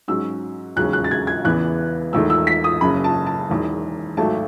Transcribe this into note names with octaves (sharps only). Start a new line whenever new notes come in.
G#2 F#3 C#4 E6
E1 D#2 C#3 F#3 C#4 F#6
F#6
A6
G#6
G#6
E2 C#3 E3 B3 F#6
E1 E2 D#3 A3 E6
E6
B6
D#6
F#1 F#2 C#3 B5
A5
A5
E1 E2 D#3
G#1 G#2 F#3 A3 A5